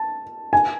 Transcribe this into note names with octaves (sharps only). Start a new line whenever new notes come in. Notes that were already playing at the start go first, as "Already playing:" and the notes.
Already playing: A5
G#5